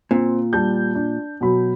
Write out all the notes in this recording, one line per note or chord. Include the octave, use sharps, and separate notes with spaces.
A#2 C4
G3 A5 G6
D4
B2 F#3 B5